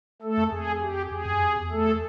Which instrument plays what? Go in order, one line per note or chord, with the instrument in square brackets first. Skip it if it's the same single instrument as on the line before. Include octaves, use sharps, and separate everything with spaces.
[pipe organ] A3 A4
[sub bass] F2
[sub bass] F2 [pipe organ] G#4
[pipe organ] G4
[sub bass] F2 [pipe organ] G#4
[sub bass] F#2
F2
E2
[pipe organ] A3 A4